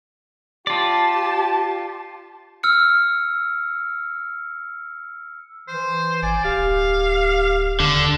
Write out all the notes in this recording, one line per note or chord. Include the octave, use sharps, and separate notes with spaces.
F4 G4 D5 A5
E6 F6 C#7
E3 C5
G#1 D5 G#5
D1 G4 F5
D#2 D3